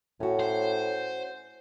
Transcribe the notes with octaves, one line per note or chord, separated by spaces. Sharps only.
A2 C#4 F#4
C5